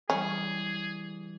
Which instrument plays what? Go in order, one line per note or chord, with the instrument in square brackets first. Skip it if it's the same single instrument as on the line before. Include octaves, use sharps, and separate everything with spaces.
[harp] E3 G3 [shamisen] C#4 [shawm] G#4